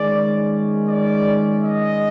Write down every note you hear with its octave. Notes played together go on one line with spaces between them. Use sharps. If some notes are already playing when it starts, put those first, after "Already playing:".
Already playing: D#3 G#3 C#4 D5
D5
D#5